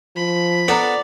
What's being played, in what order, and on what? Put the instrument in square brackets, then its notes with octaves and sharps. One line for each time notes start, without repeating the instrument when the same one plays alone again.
[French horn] F3 [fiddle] B5
[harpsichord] B3 D4 A4 [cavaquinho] D5 A#5